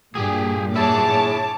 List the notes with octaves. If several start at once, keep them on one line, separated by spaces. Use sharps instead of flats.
G2 A#2 G4 G#4
E4 G#4 C#5 A5 D6